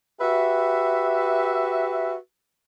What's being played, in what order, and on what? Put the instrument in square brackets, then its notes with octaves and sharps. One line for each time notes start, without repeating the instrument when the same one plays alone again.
[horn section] F#4 G4 B4 E5